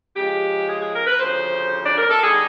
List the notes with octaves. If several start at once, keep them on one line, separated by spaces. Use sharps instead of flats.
C#3 F3 G#3 G4
G#4
G#4
A#4
B4
D2 C#3 F3 C5
D5
A#4
A4
D3 G3 B3 D#4 G#4